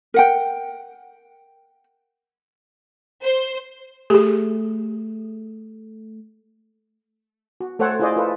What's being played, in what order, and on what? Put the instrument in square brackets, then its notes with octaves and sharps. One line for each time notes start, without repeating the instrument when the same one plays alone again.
[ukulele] A#4 F#5 G5
[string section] C5
[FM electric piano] A3 [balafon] G4 G#4
[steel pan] F#4
A3 A4 C5 C#5 F#5 G5
E4 F4 G#4 C5 D5 D#5
F4 A4 B4 C5